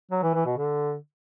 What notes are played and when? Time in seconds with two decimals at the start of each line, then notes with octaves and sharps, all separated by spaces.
0.11 F#3
0.23 E3
0.34 E3
0.46 B2
0.57 D3